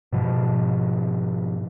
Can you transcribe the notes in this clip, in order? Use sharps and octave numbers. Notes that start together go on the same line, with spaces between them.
G#2 B2 F3